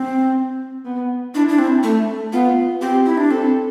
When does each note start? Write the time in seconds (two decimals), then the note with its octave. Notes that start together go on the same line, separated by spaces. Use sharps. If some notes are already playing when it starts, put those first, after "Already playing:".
Already playing: C4
0.85 B3
1.35 D4 E4
1.49 D4
1.59 C4
1.83 A3
2.33 B3 F4
2.81 C4 G4
3.06 E4
3.18 D4
3.31 C4 A4